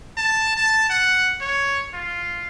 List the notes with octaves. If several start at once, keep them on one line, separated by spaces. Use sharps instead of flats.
A5
A5
F#5
C#5
F4